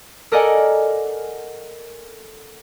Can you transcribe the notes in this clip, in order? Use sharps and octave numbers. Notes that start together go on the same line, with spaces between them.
A4 A#4 D5 D#5 F#5 G#5